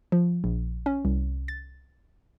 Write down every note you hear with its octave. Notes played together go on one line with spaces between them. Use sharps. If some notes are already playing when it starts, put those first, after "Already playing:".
F3
A#1
C#4
C2
A6